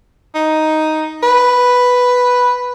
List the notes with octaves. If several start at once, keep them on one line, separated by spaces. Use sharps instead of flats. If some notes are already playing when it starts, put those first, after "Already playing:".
D#4
B4